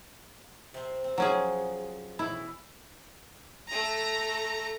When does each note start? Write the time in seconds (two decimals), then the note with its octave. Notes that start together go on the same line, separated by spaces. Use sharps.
0.74 C3 C4
1.04 C4
1.18 F3 F#3 C#4 G#4
2.19 B2 E3 E4
3.68 A3 A#5